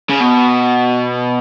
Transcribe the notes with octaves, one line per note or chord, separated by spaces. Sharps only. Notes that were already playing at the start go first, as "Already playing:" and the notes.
C#3
B2